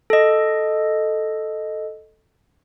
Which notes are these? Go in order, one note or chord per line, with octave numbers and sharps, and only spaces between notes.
A4 D#5